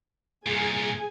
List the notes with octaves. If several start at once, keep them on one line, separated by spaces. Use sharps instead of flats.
C2 A#2 G#4 G#5